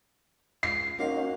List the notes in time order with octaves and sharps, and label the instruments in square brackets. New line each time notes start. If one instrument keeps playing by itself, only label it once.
[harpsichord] C#2 [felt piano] C7
[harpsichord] A#3 C5 [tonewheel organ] C#4 D#4 F#4